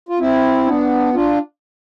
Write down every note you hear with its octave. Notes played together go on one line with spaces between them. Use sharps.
F4
C4 E4
B3 D4
D4 F4